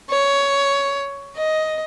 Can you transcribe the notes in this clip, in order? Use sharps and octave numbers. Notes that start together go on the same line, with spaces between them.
C#5
D#5